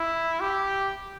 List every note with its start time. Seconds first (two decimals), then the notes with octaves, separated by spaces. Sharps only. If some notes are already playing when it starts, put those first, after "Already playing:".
Already playing: E4
0.40 G4